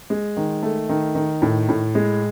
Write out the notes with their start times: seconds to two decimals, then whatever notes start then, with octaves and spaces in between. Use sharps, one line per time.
0.10 G#3
0.37 D#3
0.63 A3
0.89 D#3
1.15 D#3
1.42 A2
1.69 A2
1.95 G#3